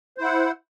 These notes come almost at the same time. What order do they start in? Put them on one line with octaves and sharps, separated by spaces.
C5 E4 F#5